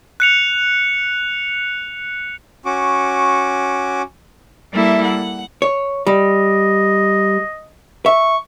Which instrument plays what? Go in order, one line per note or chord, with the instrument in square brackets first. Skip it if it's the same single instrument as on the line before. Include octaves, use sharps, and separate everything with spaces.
[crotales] F#6 C#7 F7
[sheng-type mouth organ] C#4 F#4 D6
[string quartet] G3 A#3 E4 A4 E5
F#5
[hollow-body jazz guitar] C#5
[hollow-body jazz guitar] G3 [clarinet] D#5
[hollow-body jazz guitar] E5 [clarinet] C#6